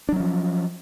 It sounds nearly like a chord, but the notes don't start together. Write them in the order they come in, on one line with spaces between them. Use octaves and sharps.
D4 F#3 C#4 F3